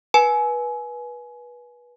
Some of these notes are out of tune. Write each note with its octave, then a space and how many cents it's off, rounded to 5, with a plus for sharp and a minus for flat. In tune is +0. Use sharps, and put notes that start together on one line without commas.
B4 -25 G#5 +25